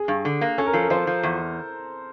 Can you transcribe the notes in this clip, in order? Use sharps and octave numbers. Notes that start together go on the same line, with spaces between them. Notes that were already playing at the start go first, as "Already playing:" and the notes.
Already playing: G#4
G2
D3
A#3
C#4 A4
A#4
F3 A4
A#4
F3 C5
F3
E2